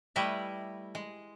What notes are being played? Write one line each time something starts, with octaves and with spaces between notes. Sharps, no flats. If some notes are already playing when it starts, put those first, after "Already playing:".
G3 A3 E4 B4 D#5 E5
G#3